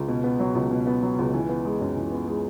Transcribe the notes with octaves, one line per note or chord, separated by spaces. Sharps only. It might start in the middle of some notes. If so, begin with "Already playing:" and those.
Already playing: C#2
B2
B3
F#3
C#2
B2
B3
F#3
C#2
E3
B3
G#3
F#2
E3
B3
G#3